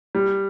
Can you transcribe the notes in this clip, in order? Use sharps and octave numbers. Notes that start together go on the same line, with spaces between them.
G3